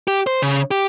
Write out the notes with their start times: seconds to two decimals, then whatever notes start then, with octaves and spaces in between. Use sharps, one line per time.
0.08 G4
0.27 C5
0.42 C#3
0.71 G4